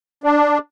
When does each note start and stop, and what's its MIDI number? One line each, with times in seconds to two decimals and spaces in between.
0.24 0.58 62